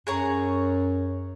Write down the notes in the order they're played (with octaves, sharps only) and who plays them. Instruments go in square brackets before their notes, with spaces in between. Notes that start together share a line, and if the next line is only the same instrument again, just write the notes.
[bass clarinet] F#2 [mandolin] G#4 C#5 A#5